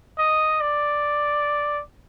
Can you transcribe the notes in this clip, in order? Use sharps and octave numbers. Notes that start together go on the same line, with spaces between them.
D#5
D5